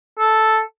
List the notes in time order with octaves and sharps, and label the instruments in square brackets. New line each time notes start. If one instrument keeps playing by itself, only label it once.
[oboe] A4